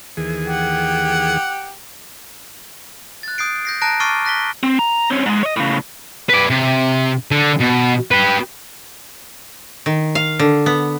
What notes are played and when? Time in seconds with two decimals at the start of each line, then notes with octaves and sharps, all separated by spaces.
0.17 D#2 E3 G#4
0.46 G4 F#5
3.23 F#6 A6
3.38 D#6 G6 C7 D7
3.65 G6 A#6 C7
3.82 A5 A#5 F#6 A#6 D7
4.00 C#6 D6 F6 A6 C7 D#7
4.25 F#6 A#6 B6 G7
4.63 C4
4.79 A#5
5.11 C4 C#4
5.26 G#2 G#3
5.43 C#5 D#5
5.56 A2 C#3
6.30 B4 D5
6.50 C3
7.31 D3
7.60 B2
8.11 G4 B4
9.86 D#3
10.15 F5
10.39 D3
10.66 B3